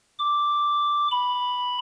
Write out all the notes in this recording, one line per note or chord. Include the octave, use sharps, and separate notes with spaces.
D6
B5